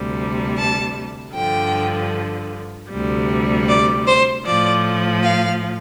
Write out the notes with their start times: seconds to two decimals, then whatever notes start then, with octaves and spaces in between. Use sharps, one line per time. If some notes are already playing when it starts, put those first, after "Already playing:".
Already playing: D2 C3 G3
0.58 A5
1.34 G2 D3 F3 G5
2.90 D2 C3 G3
3.68 D5
4.06 C5
4.45 A2 F3 D5
5.23 F5